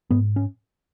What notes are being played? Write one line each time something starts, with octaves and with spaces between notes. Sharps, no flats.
G#2 B3
C#4